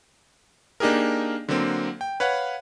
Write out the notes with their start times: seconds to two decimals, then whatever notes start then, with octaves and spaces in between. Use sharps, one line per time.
0.80 A#3 D4 D#4 G4 G#4 A#4
1.49 D3 F#3 A#3 C4
2.01 G5
2.20 B4 C#5 F5 F#5